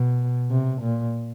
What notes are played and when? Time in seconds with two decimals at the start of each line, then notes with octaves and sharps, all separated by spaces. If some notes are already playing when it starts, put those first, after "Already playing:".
Already playing: B2
0.51 C3
0.82 A#2